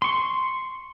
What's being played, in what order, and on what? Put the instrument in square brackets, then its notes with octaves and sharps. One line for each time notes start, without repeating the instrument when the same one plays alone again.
[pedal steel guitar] C6 C#6